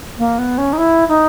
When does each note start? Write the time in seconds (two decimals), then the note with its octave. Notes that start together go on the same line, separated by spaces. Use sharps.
0.18 A#3
0.38 B3
0.58 C#4
0.73 D#4
0.78 E4
1.08 D#4